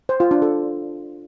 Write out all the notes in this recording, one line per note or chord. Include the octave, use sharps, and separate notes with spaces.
C5
F4
D4
A4